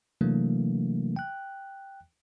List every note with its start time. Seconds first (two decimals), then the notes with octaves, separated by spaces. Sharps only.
0.21 C3 E3 F#3 A3 A#3 D4
1.16 G5 F#6